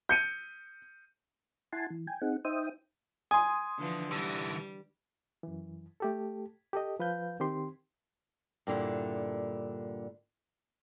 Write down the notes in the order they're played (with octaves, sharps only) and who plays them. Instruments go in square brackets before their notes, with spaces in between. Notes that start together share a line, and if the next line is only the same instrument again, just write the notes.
[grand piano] G6 C#7 D#7
[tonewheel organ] E4 F#5 G#5 A5 C6
E3
G5 G#5
C4 D#4 G#4 F#5
D#4 C5 E5 G5 D#6
[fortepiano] G#5 [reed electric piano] C6 D#6
[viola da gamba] D3 E3 F3
[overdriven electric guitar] D3 E3 [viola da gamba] G3
[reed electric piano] F#2 E3
A3 G4 A4
G4 A4 D#5
F3 B4 F5 G6
D#3 C4 G4 C6
[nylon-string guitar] G2 A#2 D3 E4